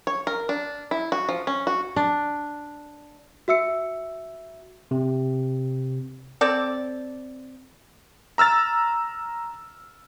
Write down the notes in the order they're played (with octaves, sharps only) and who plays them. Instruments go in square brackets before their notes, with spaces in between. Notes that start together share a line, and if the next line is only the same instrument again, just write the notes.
[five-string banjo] C#5
A#4
D4
E4
F#4
F3
C#4
F#4
[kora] D4
[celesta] F#4 E5 E6 C#7
[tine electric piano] C3
[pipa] C4 A4 D5
[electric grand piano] A#5 E6 F6 A6